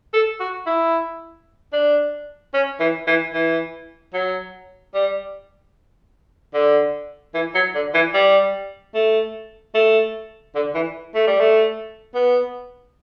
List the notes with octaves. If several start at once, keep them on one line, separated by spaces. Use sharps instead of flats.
A4
F#4
E4
D4
C#4
E3
E3
E3
F#3
G3
D3
E3
F#3
D3
E3
G3
A3
A3
D3
E3
A3
G3
A3
B3